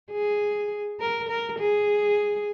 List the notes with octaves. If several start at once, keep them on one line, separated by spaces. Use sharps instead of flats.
G#4
A#4
A#4
G#4